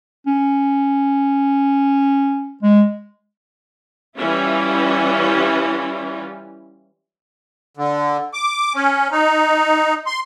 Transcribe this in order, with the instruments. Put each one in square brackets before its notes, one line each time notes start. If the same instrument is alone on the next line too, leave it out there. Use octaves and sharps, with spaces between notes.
[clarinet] C#4
G#3
[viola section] E3 G3 C#4 E4 F4
[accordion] D3
D6
C#4
D#4
C6